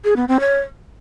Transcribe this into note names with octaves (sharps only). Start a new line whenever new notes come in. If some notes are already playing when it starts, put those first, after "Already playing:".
G#4
B3
C4
C#5